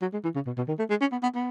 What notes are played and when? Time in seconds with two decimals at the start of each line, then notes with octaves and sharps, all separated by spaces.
0.02 F#3
0.13 G#3
0.24 E3
0.35 C#3
0.47 B2
0.58 B2
0.68 D#3
0.79 A3
0.90 G#3
1.01 C#4
1.12 B3
1.23 B3
1.35 B3